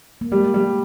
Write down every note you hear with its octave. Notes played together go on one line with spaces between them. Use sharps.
A#3
G3 G#3
G3